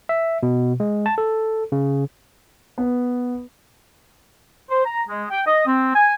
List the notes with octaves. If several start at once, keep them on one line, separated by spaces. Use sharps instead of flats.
E5
B2
G#3
A5
A4
C#3
B3
C5
A#5
G#3
G5
D#5
C4
G#5